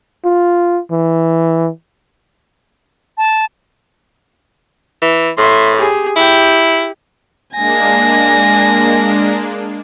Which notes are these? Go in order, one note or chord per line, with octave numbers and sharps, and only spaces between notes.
F4
E3
A5
E3
A2 E5 C6
G4 G#4
E4 G4 G5
G#3 A#3 D4 G#5 A#6